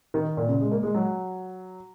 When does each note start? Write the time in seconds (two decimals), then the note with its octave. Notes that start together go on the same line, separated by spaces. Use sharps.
0.14 D#3
0.37 A#2
0.48 C#3
0.61 G#3
0.71 A#3
0.83 G#3
0.94 F#3